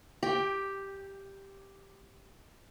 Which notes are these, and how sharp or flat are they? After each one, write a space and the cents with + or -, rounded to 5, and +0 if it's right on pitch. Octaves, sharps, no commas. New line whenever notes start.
G4 +0 G5 +20